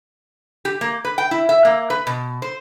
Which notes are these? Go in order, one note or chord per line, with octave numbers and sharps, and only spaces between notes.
G4
A#3
B4
G5
E4
E5
A#3
B4
B2
C5